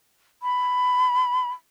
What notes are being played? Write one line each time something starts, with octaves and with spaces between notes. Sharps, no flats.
B5